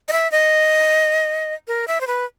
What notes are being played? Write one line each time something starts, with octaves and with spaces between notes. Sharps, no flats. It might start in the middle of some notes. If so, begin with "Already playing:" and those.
D#5
E5
D#5
A#4
E5
C5
B4